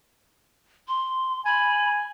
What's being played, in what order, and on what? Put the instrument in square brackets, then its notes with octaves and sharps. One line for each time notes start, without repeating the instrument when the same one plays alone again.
[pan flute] C6
[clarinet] G#5 [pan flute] B5